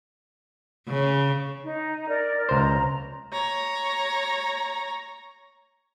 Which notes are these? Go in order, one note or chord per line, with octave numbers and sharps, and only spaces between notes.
C#3
D#4
A#4 D5
C#2 C5 A#5
C#5 A#5